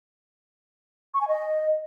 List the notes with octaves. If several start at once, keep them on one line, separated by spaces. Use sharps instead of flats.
C#6
G#5
D#5